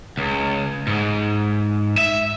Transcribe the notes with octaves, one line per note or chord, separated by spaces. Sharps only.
C#2
G#2
E5